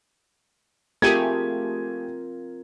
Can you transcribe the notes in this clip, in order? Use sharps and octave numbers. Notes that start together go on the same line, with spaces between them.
A3 C4 F4 G4 G#4 A#4 G#6 D#7